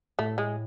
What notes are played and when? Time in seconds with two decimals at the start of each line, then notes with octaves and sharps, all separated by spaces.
0.19 A2 A3
0.38 G#3